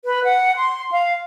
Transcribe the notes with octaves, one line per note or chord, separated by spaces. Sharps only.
B4
F#5
C6
F5